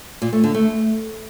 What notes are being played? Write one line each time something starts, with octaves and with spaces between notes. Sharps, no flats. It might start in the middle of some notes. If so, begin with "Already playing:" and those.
A#2
A3
D3
A3